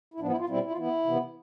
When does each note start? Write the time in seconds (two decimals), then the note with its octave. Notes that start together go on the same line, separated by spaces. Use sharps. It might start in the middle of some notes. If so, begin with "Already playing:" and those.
0.14 E4
0.20 A2 F3 B3 D4
0.30 E4
0.39 F4
0.49 B2 G3 C4 E4
0.63 E4
0.71 F4
0.77 E3 B3 E4
1.06 C3 E3 B3